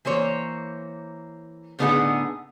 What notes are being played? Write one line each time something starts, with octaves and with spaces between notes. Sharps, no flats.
E3 A#3 C5 C#5
A2 D3 B3 D#4 G#4 F#5